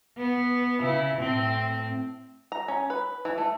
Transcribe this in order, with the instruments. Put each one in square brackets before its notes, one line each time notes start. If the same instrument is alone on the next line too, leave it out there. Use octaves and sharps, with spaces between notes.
[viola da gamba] B3
C#3 E4
A2 C4
[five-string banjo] A#5
C#4
B4
E3
A3